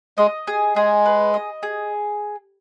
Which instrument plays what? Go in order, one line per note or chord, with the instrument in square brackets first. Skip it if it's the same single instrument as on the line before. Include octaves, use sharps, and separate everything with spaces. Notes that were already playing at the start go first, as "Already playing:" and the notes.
[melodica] G#3 [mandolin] D#5
[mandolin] G#4
[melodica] G#3 [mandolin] G#4
[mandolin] B4
D#5
G#4